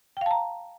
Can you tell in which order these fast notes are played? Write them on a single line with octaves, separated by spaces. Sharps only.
G5 F5 A5 A#5